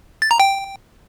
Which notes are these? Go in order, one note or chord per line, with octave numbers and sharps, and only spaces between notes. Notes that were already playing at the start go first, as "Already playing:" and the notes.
A6
A#5
G5